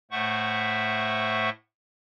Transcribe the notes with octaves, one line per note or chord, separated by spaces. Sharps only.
A2 A3 C5 E5 F#5 C#6